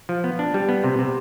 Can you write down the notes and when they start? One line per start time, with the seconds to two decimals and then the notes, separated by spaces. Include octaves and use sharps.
0.09 F3
0.24 B3
0.39 D4
0.54 G3
0.69 B3
0.84 C3
0.99 C3